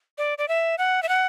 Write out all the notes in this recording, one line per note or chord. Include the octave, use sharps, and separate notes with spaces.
D5
D5
E5
F#5
E5
F#5